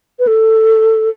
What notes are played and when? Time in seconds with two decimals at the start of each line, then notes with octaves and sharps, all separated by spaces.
0.19 B4
0.27 A4